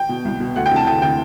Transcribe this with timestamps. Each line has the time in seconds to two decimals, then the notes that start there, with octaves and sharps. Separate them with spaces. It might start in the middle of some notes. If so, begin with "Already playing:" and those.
Already playing: G5
0.09 B2
0.25 C2
0.40 B2
0.56 D2 F#5
0.66 G5
0.72 C3 E3 A5
0.86 D2 G5
1.02 C3 E3 G5